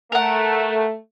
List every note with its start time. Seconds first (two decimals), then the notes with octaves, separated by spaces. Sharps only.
0.12 A3 A#4 F#5